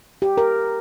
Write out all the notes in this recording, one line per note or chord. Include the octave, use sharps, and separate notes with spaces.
G4
A#4